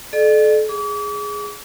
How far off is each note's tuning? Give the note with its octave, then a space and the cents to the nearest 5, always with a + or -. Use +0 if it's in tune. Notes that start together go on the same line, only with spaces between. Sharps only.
A4 -30 D5 +40
G#4 +0 D6 -40